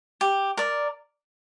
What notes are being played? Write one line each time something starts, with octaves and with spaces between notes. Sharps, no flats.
G4
A#4 D5